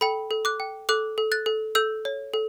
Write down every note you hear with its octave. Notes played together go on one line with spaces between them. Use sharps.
A4 G5 B5
A4
D6 F#6
G5
A4 D6 F#6
A4
F#6 A6
A4
A4 E6 G6
C#5
A4